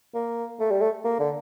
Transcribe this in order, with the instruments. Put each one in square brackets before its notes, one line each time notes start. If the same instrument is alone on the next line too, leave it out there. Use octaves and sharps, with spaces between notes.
[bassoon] A#3
A3
G3
A3
A#3
D3